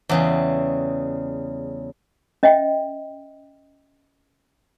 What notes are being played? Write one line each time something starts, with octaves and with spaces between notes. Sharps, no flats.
E2 C#3 G3
C#4 D#5 E5 G5